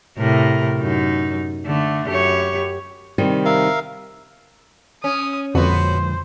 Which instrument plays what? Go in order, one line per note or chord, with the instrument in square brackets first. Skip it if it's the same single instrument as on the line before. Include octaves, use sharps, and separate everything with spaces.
[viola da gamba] A2 C3 A#4
F#2 D#4
D3 A3
F#2 G4 C#5
[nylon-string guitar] C3 D#3 G3
[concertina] A#4 E5 F5
[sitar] C#4 [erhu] D#6
[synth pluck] F2 [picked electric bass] D3 F3 G#3 [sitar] B3 F#4 [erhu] C5